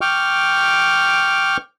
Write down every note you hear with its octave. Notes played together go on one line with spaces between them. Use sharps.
G5 C#6 D6 F6